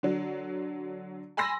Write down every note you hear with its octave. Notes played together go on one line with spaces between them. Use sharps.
D3 F#3
G#5 B5 C6 E6 A#6